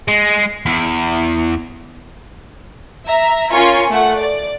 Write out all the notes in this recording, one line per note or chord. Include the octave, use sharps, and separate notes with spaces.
G#3
E2
E5 A#5
C#4 F4 A#4 G#5 C#6
A3 F#5
D5